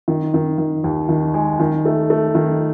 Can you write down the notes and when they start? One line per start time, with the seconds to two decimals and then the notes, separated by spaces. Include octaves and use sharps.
0.08 D#3
0.34 D#3
0.58 D#3
0.84 D#2
1.09 D#3
1.34 G#3
1.60 D#3
1.85 A3
2.10 A3
2.35 D#3